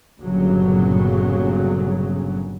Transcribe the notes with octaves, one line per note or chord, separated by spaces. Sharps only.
G1 G2 A#2 C#3 F#3